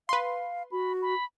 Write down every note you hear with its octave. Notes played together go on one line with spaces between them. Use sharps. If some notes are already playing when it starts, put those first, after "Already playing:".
B4 F5 C6
F#4 B5
B5